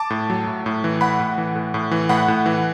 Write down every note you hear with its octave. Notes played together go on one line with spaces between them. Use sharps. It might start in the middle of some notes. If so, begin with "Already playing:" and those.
Already playing: A5 D6
A2
F#3
A2
A2
E3
A2 F#5 B5
A2
E3
A2
A2
E3
A2 F#5 B5
A2
E3